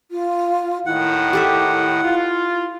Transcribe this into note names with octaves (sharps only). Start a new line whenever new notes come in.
F4
D#2 A2 D#3 E4 F#5
G4 A4 E5
F4